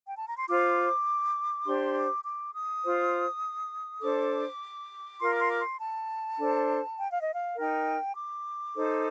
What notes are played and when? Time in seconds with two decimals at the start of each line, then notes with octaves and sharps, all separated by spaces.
0.08 G5
0.17 A5
0.27 A#5
0.37 C6
0.48 F4 C5 D6
1.65 D4 G4 C5 C6
1.95 D6
2.24 D6
2.54 D#6
2.85 F4 C5
4.02 D4 A4 C5 D6
5.20 F4 A#4 C6
5.31 D6
5.40 C6
5.50 D6
5.59 C6
5.79 A5
6.39 D4 A4 C5
6.98 G5
7.09 F5
7.21 D#5
7.33 F5
7.57 D#4 A#4 G5
8.16 D6
8.76 D#4 A4 C5